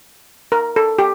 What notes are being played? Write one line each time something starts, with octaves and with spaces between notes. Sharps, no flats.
A#4
A4
G4